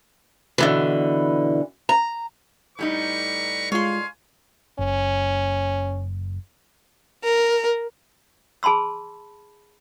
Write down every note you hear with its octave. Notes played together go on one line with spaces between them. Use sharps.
B2 D3 E3
A#5
A2 G3 D#4 B4 A#5 C#6
G#3 F4 C#5 F5 G#5 C6
F#1 C#4
A#4
G#4 A5 B5 C6 E6